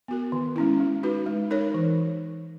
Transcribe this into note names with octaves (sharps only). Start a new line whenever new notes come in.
B3 F#4 A#4
D#3
G#3 C#4 E4
G#3
D#4 F#4 B4
G#3
D#4 A#4 C#5
E3